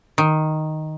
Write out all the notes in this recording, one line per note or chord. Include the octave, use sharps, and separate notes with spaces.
D#3